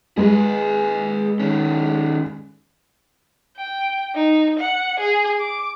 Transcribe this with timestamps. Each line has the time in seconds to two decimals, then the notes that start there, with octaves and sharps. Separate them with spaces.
0.18 G#3 G#4 B4
1.40 D#3 C#4
3.57 G5
4.15 D#4
4.59 F#5
4.99 G#4
5.40 D6